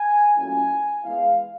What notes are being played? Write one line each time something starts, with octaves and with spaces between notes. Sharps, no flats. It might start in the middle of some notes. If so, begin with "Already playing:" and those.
Already playing: G#5
A#2 F#3 A3 C#4 E4 G#5
E3 G#3 B3 E4 F5